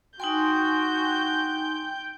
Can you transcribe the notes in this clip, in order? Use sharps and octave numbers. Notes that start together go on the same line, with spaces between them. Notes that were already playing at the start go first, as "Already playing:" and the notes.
D#4 F#4 G5 G#5 C6 G6